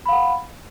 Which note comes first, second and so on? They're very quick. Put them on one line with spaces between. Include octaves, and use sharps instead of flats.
B5 F5 F#5